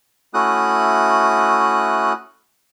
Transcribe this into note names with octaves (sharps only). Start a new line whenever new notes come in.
A3 C#4 E4 F#4 D#6 F#6